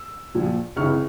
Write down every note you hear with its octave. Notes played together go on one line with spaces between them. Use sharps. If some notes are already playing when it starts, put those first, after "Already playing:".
Already playing: E6
A#1 A#2 F3
C#2 C3 E3 C#6 F6